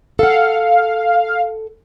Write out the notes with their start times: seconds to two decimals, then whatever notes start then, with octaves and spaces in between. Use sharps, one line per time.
0.19 A4 F5 F#5